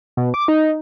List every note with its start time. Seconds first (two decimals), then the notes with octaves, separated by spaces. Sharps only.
0.17 B2
0.34 D6
0.48 D#4